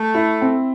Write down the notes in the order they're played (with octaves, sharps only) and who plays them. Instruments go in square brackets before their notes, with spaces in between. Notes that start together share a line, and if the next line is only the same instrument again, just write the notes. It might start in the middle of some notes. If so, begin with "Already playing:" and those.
Already playing: [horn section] A3
[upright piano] E4
C4